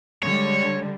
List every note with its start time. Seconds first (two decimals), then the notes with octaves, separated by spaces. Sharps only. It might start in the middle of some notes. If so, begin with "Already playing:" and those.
0.23 D3 G3 G#3 C#5